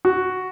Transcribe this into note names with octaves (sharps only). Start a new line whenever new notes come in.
F#4